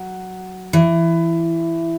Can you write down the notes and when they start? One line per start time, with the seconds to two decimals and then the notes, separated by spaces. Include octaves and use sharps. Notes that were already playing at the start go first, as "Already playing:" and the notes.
Already playing: F#3
0.73 E3